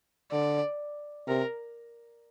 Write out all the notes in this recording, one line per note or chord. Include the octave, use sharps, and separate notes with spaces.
D3 D5
C3 A#4